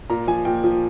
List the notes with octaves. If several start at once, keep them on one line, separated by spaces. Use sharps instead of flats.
A#2 A#5
F3 G#5
A#2 G5
F3